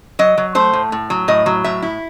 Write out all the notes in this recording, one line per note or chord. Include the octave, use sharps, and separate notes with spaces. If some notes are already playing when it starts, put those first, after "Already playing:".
F#3 D#5
F#3
A3 C5
A2
A2
F#3
A2 D#5
F#3
A2 E5
E4